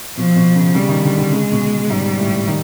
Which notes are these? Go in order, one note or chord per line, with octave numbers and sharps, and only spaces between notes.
B2 F3
B2
C#3
C#3 G3
D#3
D3
D3
C#3 G#3
B2
G#2 G3
A2
D#3